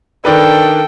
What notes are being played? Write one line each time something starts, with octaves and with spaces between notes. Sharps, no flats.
D#3 D4 A4 B4 G5